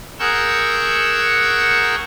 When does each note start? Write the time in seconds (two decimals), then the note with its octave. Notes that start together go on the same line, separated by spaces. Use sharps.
0.19 G#4 A#4 F#5 C#6 E6 G6